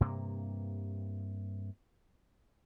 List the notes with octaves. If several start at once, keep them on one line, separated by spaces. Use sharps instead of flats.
G2 C3 A#3